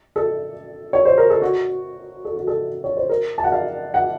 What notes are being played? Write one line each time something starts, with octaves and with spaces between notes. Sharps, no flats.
A4
C#5
C5
A#4
A4
F#4
A4
F#4
A4
C#5
C5
A#4
A5
F#5
F5
F#5